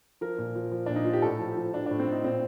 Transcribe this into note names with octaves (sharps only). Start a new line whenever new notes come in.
F3 A#4
A#2
F3
F3
A#2 D4
D#4
F3 F4
G4
A2 A4
F3
F3
F3 D4
A2 D4
C4
A2 D#4
A#2 C4